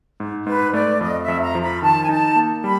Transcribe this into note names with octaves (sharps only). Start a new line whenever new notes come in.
G#2
G#2 B4
A3 D5
F2 D#5
E5
F2
A#5
F3
B5
D#3 A5
G#5
D#4 A5
A#3
G3 B5